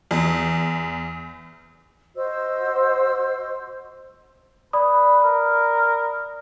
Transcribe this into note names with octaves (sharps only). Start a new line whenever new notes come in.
E2
F#4 C5 D#5 E6
B4 D5 B5 D#6
A#4